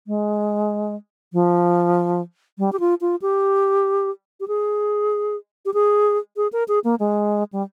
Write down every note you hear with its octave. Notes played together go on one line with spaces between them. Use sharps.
G#3
F3
G3
G4
F4
F4
G4
G4
G#4
G4
G#4
G#4
A#4
G#4
A#3
G#3
G3